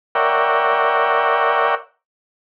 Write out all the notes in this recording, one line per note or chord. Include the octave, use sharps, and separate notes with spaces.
A#4 C#5 D5 E5 F#5 G5